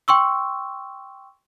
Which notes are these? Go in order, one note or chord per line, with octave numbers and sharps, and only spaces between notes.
G5 C6 C#6 E6